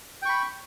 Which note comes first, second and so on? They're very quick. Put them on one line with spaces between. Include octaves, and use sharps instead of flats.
G5 C#6 B5